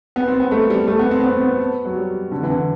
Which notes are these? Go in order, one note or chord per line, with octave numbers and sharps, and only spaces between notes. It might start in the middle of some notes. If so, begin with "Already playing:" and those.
B3
C4
B3
A3
G3
A3
B3
C4
B3
C4
B3
F#3
G3
D3
E3
D3